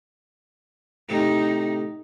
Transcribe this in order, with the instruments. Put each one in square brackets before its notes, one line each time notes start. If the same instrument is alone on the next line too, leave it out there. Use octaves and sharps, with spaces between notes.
[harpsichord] A2 C3 [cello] D#4